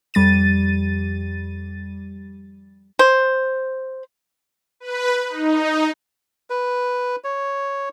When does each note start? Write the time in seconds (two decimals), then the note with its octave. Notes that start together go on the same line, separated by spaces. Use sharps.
0.14 F2 G3 A6 D#7
2.99 C5
4.80 B4
5.29 D#4
6.50 B4
7.24 C#5